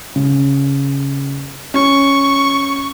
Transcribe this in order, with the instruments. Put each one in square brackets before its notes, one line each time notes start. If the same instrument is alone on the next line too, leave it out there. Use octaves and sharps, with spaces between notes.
[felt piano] C#3
[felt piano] C#4 [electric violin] C#6